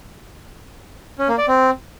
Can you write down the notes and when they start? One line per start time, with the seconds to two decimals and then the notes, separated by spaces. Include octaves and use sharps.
1.19 C#4
1.28 A#3
1.38 D5
1.48 C4